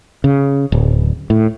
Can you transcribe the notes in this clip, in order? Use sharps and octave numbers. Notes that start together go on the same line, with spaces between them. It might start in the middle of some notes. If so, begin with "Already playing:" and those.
C#3
D1
A2